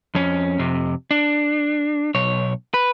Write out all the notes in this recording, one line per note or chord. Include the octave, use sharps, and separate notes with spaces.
F2 C#4
F2 C3
D4
B1 C#5
B4